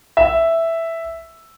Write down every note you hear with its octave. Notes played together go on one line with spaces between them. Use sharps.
E5